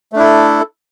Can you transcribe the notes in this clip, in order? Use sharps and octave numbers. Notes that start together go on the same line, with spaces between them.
A3 D4 E4 A4